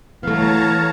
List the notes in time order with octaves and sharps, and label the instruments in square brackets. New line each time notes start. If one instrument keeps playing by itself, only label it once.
[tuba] E3 [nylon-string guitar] A3 B3 [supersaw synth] C#5 A5 A#5 [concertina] F5